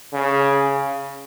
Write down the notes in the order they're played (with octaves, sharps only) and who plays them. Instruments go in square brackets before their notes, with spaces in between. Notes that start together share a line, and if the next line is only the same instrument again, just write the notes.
[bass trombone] C#3